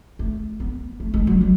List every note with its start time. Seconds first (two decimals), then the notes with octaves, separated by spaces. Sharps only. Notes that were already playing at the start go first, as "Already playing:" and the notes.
0.19 A3
0.60 B3
1.00 A3
1.14 G#3
1.27 F#3
1.41 F#3